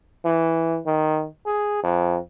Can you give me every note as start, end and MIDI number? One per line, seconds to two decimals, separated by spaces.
0.25 0.79 52
0.86 1.27 51
1.46 1.79 68
1.83 2.18 41